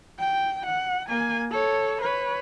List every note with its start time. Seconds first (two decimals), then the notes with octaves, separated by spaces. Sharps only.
0.19 G5
0.66 F#5
1.08 A#3 G#5
1.51 A4 C#5
2.01 B4 C#5